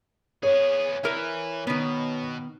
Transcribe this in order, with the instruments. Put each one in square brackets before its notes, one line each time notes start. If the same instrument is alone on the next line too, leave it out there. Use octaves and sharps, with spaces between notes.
[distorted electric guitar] B3 G#4 [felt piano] C#5
[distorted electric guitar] E3 [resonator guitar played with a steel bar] A#4 E5
[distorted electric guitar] B2 [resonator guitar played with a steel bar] D#3 B3